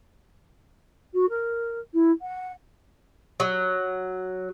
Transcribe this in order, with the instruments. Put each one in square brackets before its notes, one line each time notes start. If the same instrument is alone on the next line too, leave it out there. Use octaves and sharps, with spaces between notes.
[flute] F#4
A#4
E4
F#5
[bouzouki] F#3